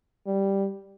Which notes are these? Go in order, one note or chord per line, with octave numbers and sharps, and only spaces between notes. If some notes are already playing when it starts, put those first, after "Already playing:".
G3